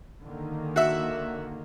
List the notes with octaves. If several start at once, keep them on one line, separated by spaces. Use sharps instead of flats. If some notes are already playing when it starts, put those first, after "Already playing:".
D3 D#3 A#3
F#4 E5